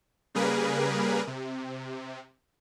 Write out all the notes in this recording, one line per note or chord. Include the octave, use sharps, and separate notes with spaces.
C#3 G3 A#3 G#4 A#4 B4
C3